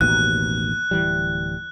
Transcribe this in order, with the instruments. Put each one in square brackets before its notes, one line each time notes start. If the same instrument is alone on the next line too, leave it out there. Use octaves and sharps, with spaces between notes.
[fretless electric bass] A1 D#2 B2 [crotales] F#6
[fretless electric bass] D1 E3 G3